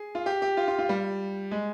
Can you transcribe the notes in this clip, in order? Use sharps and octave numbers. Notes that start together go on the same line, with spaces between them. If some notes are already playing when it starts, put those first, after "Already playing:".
Already playing: G#4
F4
G4
G4
F4
F4
F4
G3
G#3